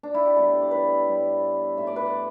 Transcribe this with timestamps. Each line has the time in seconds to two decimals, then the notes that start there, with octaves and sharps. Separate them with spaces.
0.03 D4
0.14 E4
0.26 G4
0.36 A2 G3 B3 A4
0.61 D5
0.71 B4
1.07 A2 G3 B3
1.77 A2 A3 E5
1.87 D5
1.96 B4
2.06 D5